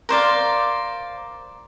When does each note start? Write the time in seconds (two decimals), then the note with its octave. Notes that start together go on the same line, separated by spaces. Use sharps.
0.09 A#4 C5 D5 F5